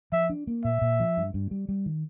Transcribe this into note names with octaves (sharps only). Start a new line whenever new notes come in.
F3 E5
D4
A#3
A#2 E5
A#2
F3
G2
G2
G3
G3
D#3